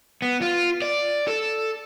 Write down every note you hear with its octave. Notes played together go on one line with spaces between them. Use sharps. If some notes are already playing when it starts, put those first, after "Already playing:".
B3
F4
D5
A4